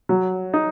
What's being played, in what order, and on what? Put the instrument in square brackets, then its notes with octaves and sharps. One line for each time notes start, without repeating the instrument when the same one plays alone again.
[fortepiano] F#3
D#4